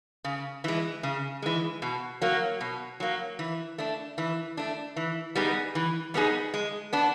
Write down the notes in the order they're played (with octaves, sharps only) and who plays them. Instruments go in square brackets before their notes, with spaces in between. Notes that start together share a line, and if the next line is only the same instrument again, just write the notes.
[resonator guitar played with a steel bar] C#3
E3 G#3
C#3
E3 G#3
B2
F#3 A#3
B2
F#3 A#3
E3
A3 D4
E3
A3 D4
E3
G3 B3 D#4 G#4
E3
G3 B3 D#4 G#4
G#3
B3 D4